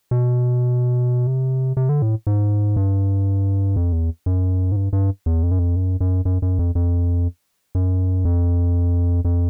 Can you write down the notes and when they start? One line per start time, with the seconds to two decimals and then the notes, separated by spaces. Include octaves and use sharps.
0.11 B2
1.27 C3
1.77 C3
1.89 D3
2.02 A2
2.27 G#2
2.76 G2
3.76 F2
3.92 E2
4.26 F#2
4.72 G#2
4.76 G2
4.93 G2
5.26 E2
5.43 F2
5.51 F#2
5.59 F2
5.76 F#2
6.00 F#2
6.25 F#2
6.42 F#2
6.59 F2
6.75 F2
7.75 F#2
8.25 F2
9.25 F2